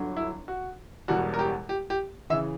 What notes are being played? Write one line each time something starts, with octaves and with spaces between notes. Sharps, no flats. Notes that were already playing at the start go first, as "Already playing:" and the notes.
Already playing: G1 G2 D3 F#3
E4
F#4
E1 E2 B2 G3 F#4
A#4
G4
G4
G4
C#3 E3 E5